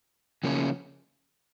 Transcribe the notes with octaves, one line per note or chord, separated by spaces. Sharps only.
C#3 F3 A#3 C#4